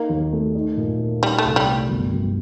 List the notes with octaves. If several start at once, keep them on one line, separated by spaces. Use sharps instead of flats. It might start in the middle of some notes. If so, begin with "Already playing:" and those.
Already playing: A#3 D#4
D#2
A3
D#4
A#2
A#3
G3 D#4
A3
C2
G3
A3
G1
G1